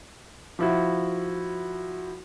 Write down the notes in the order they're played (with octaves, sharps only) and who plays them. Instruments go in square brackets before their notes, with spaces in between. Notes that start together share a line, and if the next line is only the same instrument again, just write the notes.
[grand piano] F3 E4 F#4